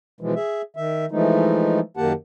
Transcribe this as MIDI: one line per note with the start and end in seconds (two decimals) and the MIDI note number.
0.21 0.34 47
0.21 0.34 52
0.21 0.34 53
0.21 0.34 56
0.36 0.62 68
0.36 0.62 76
0.77 1.05 51
0.77 1.05 76
1.11 1.80 52
1.11 1.80 53
1.11 1.80 56
1.11 1.80 57
1.11 1.80 63
1.97 2.13 42
1.97 2.13 51
1.97 2.13 58
1.97 2.13 67
1.97 2.13 78
1.97 2.13 81